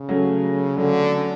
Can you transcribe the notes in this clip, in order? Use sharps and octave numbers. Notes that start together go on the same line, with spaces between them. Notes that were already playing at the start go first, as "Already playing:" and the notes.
Already playing: C#3
F#3 A3 C#4
D3 F#3 A3 C#4